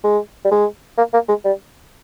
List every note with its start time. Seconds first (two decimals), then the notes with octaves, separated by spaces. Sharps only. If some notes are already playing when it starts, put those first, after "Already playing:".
0.04 G#3
0.44 G3
0.51 G#3
0.98 A#3
1.13 A#3
1.28 G#3
1.45 G3